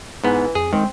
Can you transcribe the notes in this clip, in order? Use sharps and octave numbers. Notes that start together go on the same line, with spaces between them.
G#2 E3 B3
F2 G#4
D#3 G#3 C4